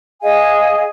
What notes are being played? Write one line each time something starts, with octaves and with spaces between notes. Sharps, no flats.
G#4 D#5 F5 G#5